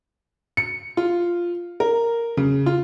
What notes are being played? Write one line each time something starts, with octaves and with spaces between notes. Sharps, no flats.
C#7
F4
A#4
C#3
F4